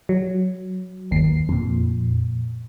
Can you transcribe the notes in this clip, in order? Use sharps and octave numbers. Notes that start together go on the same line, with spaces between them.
F#3
G1 D#2 C7
F2 A#2